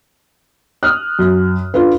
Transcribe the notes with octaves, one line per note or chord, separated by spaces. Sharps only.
D#6 F6 F#6
F#2
D4 F4 A4 B4